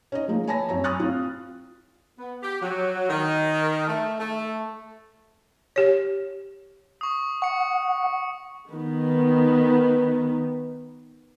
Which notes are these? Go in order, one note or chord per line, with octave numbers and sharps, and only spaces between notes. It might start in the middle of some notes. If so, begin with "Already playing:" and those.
C#4 D#4 D#5
F3 G#3 A#3 D#4
C#5 G#5 A5 B5 A#6
F#2 C4 C#5 A#5
B5 C#6 D#6 F6 F#6 A6
C4 F4
B3
G4
F#3
D#3
A3
A3
G4 C#5
C#6 D#6
F#5 C#6 C#7
D#3 B3